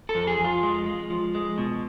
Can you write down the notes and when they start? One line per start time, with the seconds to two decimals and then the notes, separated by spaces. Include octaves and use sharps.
0.09 A4
0.15 F2
0.27 G#4
0.39 F2
0.44 F4
0.63 G#3
0.86 G#3
1.10 F3
1.35 G#3
1.58 B2